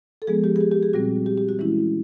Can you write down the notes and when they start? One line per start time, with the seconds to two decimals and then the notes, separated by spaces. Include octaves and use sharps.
0.22 A4
0.27 F3 G#3 B3 G#4
0.44 G4
0.56 G#4
0.61 G4
0.72 G4
0.83 G#4
0.93 A#2 G3 C4 F#4
1.26 G4
1.38 G4
1.49 F#4
1.59 E3 G#3 C#4 E4